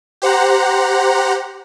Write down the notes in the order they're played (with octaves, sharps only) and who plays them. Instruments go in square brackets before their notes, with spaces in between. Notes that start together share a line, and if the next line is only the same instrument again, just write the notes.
[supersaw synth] G4 C5 F#5 A#5